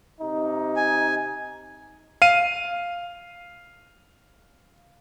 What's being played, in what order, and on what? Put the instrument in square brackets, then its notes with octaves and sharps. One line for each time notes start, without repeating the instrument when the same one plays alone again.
[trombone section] C3 D#4
[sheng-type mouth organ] G#5
[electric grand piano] F5 D#7